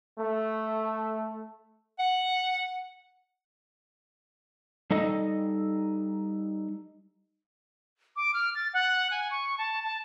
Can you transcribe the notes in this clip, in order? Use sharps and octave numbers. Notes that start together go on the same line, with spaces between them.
A3
F#5
G3 D#4 A4 D#5
D6
F6
A6
F#5
G#5
C#6
A5
A5